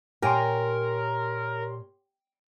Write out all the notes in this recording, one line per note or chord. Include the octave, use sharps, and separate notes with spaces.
A#2 G4 A#4 C#5 G5 G#5 C6